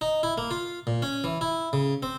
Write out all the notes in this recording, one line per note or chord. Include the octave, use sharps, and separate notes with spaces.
D#4
E4
A#3
F4
A#2
C#4
E3
E4
C#3
C4